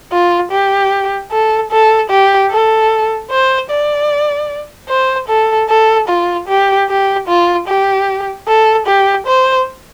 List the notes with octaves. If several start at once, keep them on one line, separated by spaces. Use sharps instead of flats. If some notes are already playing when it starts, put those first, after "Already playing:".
F4
G4
A4
A4
G4
A4
C5
D5
C5
A4
A4
F4
G4
G4
F4
G4
A4
G4
C5